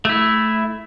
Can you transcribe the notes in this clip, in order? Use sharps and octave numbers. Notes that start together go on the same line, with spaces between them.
A3 E4